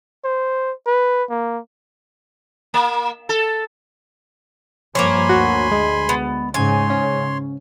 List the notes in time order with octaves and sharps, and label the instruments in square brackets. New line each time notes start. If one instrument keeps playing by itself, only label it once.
[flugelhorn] C5
B4
A#3
[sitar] A#3
A4
[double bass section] G2 F3 [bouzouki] A#3 C5 C#5 [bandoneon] G#5 B5 C6
[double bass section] D2 [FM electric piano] F#4
[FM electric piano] G#3
[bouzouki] B3
[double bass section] G#2 C#3 [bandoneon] C#5 C6 [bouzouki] G#5
[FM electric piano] C#4